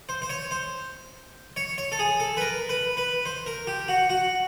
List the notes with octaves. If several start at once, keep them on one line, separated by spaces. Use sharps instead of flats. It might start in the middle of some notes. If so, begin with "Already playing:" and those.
C5
C5
C#5
C5
C#5
C#5
A4
G#4
A4
B4
A#4
B4
B4
C5
A#4
G4
F#4
F#4